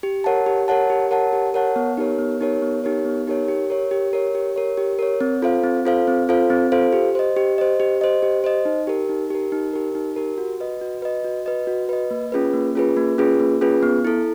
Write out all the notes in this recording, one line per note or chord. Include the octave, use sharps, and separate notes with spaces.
G4
A#4 C#5 F#5 A5
G4
A#4 C#5 F#5 A5
G4
A#4 C#5 F#5 A5
G4
A#4 C#5 F#5 A5
B3
D#4 G4 A#4 C#5
B3
D#4 G4 A#4 C#5
B3
D#4 G4 A#4 C#5
B3
D#4 G4 A#4 C#5
G4
A#4 C#5
G4
A#4 C#5
G4
A#4 C#5
G4
A#4 C#5
C4
F4 A4 C5 F5
C4
F4 A4 C5 F5
C4
F4 A4 C5 F5
C4
F4 A4 C5 F5
G4
C5 D#5
G4
C5 D#5
G4
C5 D#5
G4
C5 D#5
D#4
G4 A#4
D#4
G4 A#4
D#4
G4 A#4
D#4
G4 A#4
F#4
B4 D#5
F#4
B4 D#5
F#4
B4 D#5
F#4
B4 D#5
A#3
C#4 F4 G#4 B4
A#3
C#4 F4 G#4 B4
A#3
C#4 F4 G#4 B4
A#3
C#4 F4 G#4 B4
B3
E4 A4